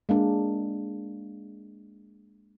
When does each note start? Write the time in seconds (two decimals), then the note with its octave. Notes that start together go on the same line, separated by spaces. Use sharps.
0.09 G#3 A#3 D4